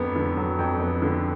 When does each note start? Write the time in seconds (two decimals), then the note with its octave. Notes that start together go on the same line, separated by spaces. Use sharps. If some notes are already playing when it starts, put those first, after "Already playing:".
Already playing: F2 D3 F#3 B3
0.16 D3
0.37 F#3
0.59 F2
0.80 B3
1.02 D3